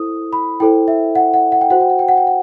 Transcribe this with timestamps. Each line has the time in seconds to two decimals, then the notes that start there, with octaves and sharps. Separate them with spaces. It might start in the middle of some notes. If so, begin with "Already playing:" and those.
Already playing: E4 A4 C5 D#6
0.33 B5
0.60 E4 A4 C5 G5
0.88 E5
1.15 F#5
1.34 F#5
1.52 F#5
1.61 G5
1.70 F#4 C5 F#5
1.80 G5
1.90 F#5
1.99 G5
2.08 F#5
2.17 G5
2.27 F#5